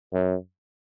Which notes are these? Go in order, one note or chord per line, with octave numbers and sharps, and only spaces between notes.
F#2